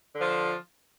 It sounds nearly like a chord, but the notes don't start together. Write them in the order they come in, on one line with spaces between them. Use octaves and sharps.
D3 F3 F4